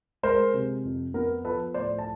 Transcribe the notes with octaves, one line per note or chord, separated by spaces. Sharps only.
G#3 A#4 C5
C3
F2
B3 A#4
F3 A4 B4
A2 C5 D5
A5